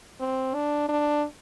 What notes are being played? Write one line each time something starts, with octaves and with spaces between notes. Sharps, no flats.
C4
D4
D4